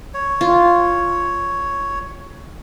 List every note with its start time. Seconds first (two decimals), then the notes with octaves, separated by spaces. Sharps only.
0.14 C#5
0.41 F4